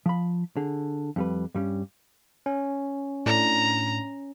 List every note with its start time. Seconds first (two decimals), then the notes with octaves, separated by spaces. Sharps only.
0.06 F3 B5
0.57 D3 G#4
1.16 F2 G3 B4
1.55 G2 G3 C#4
2.46 C#4
3.26 A2 D4 A#5